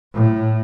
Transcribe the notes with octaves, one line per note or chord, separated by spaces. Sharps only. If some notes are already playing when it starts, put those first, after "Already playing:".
A2